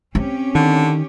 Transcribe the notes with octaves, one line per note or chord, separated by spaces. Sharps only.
C4 C#4 G4
D3 D#3